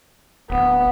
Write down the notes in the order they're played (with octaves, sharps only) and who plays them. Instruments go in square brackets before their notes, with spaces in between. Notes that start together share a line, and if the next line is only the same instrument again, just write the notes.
[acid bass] D1 [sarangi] B3